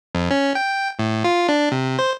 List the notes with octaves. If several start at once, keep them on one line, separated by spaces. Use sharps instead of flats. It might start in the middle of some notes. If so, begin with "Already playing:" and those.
F2
C#4
G5
A2
F4
D4
C3
C5